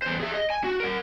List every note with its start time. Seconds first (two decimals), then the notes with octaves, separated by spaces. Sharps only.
0.02 E2 C5
0.19 G#4 E5
0.34 D#5
0.50 G#5
0.64 F#4
0.80 A#4 F#5